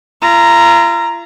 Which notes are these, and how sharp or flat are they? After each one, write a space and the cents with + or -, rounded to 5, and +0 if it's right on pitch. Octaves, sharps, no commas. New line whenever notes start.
F4 -45 A#5 +0